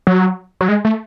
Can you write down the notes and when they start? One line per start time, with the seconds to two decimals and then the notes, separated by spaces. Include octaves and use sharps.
0.07 F#3
0.61 F#3
0.69 G#3
0.85 A3